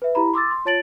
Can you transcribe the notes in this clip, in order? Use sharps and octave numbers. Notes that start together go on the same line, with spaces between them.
B4 E5
E4 G4 A#5 B5
C6 D6 E6 A6
C6
F4 C#5 A5 A6 D7 F#7